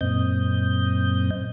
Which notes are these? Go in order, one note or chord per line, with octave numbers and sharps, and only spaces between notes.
F#2 A#2 C4 D#5 G6